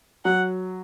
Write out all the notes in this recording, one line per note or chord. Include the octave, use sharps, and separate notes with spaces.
F#3 F#5